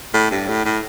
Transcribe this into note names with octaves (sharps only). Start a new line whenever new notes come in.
A2
G2
A2
A2